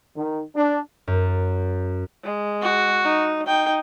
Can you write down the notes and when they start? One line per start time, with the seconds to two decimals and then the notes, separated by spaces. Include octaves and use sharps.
0.16 D#3
0.55 D4
1.07 F#2
2.24 G#3
2.62 F#4
3.04 D#4
3.47 D#4 G5